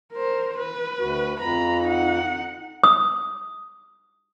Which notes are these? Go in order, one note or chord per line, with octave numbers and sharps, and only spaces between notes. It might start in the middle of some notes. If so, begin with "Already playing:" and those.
A#4 C5
B4
D2 F#4
F2 A#5 B5
D#4 F#5
D#6